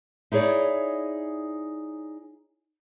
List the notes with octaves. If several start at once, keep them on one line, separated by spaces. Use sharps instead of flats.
D#4 E4 G#4 C#5 D5